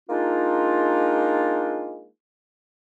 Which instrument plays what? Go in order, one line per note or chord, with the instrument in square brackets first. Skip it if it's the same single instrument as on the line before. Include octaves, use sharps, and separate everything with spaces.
[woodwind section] G#3 A#3 D4 D#4 F4